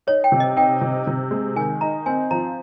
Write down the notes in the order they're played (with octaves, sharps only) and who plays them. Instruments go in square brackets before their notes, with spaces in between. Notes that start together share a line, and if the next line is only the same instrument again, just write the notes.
[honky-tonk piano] D#4 [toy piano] C#5
[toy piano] G5
[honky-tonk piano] C3
[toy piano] D#5
[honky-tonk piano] D#4 [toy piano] G5
[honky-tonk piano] C3
C3
G#3
[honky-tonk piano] D#3 [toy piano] G#5
[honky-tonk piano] D#4 [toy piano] A#5
[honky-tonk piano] C4 [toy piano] G#5
[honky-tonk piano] F3 [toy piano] A#5